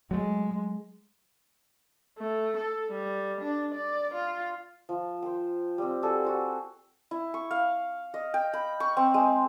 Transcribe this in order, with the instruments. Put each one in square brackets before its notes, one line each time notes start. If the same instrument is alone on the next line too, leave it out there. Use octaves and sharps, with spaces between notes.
[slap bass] F#3 A3 [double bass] G#3
[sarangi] A3
A4
G3
D4
D5
F4
[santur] F3
C5 G5
G3 C4
G3 F#4 G#4 A4
F#4 C5
E4
C#6
F5
D#5
G5
B5
C#6
C4
G#3